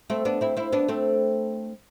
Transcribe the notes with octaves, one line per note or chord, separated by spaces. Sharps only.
A3 C4
B3 D4
C4 E4
C4 E4
B3 D4
A3 C4